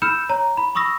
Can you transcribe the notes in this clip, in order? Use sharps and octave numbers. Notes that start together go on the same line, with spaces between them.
B5 E6 F6 G6 C#7 E7
C#5 A#5
B5
B5 C#6 D#6 E6 A#6